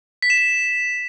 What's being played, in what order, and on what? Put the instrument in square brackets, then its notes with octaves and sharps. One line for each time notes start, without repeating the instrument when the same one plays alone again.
[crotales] B6
E7
B6